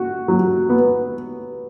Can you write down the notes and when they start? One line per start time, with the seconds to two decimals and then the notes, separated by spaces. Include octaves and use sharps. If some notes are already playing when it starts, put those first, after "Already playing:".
Already playing: F#4
0.28 F#3
0.69 B3